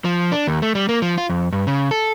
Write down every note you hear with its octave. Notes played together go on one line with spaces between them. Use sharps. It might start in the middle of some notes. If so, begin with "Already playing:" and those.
F3
D4
D#2
A3
G3
A#3
F3
F4
F2
G2
C#3
A4